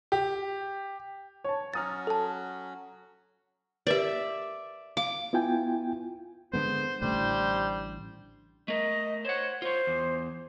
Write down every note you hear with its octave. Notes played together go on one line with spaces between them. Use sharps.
G4
C#5 A5
F#3 C#4 F#4 A#5 D#6 F6 A6
A4 A5
G4 A#4 B4 D5 E5
F5 D6
B3 E4 F4 G5 G#5
D3 G#3 B3 C5
A1 A2 D3 G3 C5
A3 A#4 D#5
C5 C#5 F#5
F4 C5 C#5
E2